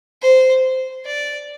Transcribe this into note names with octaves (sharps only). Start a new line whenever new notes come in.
C5
D5